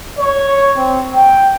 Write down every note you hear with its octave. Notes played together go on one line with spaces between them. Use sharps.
C#5
C4
G5